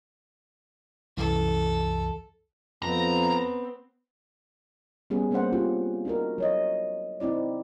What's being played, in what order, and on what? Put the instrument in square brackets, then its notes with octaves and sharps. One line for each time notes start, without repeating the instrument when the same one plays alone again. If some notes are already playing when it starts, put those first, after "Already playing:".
[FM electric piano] C2 F#2 E3 [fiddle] A4
[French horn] F2 [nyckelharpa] B3 C4 [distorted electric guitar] A#5
[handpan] G3 B3 C#4 G#4
G3 A#3 C#4 D4 C5 F#5
C4 C#4 F4 G4
D4 D#4 F#4 A#4
F#3 C#5 D#5
C4 D#4 E4 D5